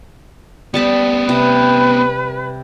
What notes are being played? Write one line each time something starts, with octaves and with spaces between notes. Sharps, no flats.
G3 B3 C4 A5 B5
C3 B4